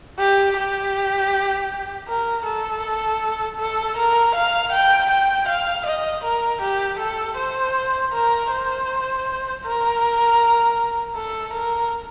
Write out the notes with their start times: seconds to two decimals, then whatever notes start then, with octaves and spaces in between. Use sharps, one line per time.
0.19 G4
0.57 G4
2.09 A#4
2.46 A4
3.59 A4
3.97 A#4
4.35 F5
4.72 G5
5.10 G5
5.49 F5
5.86 D#5
6.24 A#4
6.62 G4
6.99 A4
7.37 C5
8.13 A#4
8.51 C5
9.64 A#4
11.16 A4
11.53 A#4